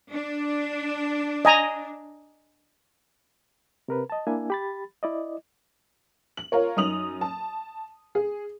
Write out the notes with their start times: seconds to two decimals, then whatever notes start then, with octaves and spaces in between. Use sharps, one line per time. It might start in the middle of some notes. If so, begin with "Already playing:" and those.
0.11 D4
1.45 D#5 G#5 A#5
3.88 C3 A#4 B4
4.10 D#5 A5
4.27 A#3 D4 E4 E5 G#5
4.50 G4 B5 A6
5.03 E4 D5 D#5
6.37 F#7
6.52 F4 A#4 C#5
6.77 F#2 D#4 D#6 F7 F#7
7.21 A5
8.15 G#4